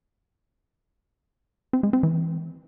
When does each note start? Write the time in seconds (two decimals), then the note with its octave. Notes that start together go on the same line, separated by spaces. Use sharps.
1.73 C4
1.83 G#3
1.93 C4
2.03 E3